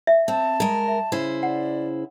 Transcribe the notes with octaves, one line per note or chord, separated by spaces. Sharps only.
E5
C4 A5
G#3 A#4
E5
C#3 E4 C5
D5 F#5